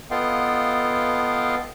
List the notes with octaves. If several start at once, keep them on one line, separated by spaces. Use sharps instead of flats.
B3 F4 A4 D#5 F5 G5